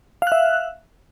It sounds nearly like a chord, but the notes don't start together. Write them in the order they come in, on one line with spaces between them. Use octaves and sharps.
F5 F#6 E5